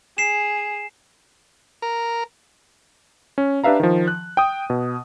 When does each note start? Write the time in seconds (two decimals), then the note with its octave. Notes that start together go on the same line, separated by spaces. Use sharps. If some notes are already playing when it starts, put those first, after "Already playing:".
0.18 G#4 C7 E7
1.82 A#4
3.38 C#4
3.64 D4 G4 B4 E5 F5 A#5
3.80 D#3 F3
4.08 F#6
4.37 G5 D#6
4.70 B2